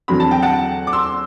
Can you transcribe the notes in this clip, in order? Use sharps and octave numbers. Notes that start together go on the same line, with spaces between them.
E2 D3 F#3 C4 B5
A5
G5
F#5 A5
D6
C6 E6